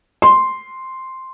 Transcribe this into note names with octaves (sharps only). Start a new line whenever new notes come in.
C6